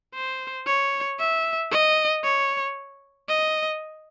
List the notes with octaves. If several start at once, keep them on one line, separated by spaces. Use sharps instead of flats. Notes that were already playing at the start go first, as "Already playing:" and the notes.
C5
C#5
E5
D#5
C#5
D#5